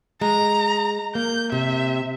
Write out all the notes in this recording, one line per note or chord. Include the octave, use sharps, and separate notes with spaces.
G#3 A#5
A#3 G6
C3 E5